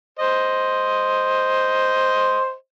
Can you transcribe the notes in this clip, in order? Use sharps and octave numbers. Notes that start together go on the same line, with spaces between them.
C5 D#5